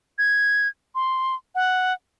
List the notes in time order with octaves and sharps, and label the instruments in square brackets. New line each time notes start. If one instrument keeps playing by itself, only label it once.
[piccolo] G#6
C6
F#5